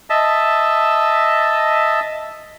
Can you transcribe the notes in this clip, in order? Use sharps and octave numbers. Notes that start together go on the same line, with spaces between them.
D#5 E5 A5